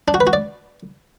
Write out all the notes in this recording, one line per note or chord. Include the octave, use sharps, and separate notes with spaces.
D4
F#4
B4
F#4
D5